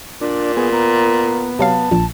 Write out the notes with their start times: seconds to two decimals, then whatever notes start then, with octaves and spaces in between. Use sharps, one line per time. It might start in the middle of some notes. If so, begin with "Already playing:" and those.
0.21 A#2 D4
0.57 B3 G#4
0.72 B3 A#5
1.59 C3 F#3 F5 A5
1.91 A#1 A#2